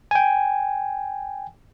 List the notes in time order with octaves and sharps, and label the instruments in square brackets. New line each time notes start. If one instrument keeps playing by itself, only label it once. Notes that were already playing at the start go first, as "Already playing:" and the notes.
[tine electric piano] G5 G#5